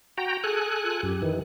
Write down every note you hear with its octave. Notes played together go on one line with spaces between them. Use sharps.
F#4 G5 A#5
G#4 A4 G#5 F#6
F4
F#2 G4
D#3 E3